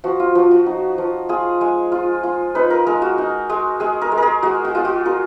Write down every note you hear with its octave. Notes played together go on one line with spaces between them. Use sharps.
F3 F#4
F4
F3 F#4
F#4
D#4
F3
F4 G#4
G#3
F4
F4
D#4 B4
A#4
G#3 A#4
F#4
D#4
G#3
G#3 G#4
A#4
G#3
A#4
G#4
G#3 F#4
F#4
F4 G#4
F#4
F4 A#4